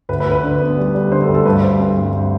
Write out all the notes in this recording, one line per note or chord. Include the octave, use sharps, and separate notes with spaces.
D2 B4
B4
D2
B4
D3
B3
G3
G3
D3 C5
A4
D2
A4
G2 B4
G2 C5
C4
G2